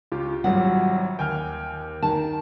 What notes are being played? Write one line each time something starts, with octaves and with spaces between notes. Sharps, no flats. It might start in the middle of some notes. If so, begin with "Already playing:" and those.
C#2 F4 G4
G#1 F#3 G3 F#5
D#2 G5 G#5 F6
D#3 A#4 A5